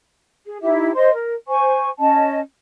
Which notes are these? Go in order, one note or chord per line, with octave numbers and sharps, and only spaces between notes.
G#4
D#4 E4 G4 E5
C5 D#5 C6
A#4
C5 G#5 C#6
C#4 D#5 A5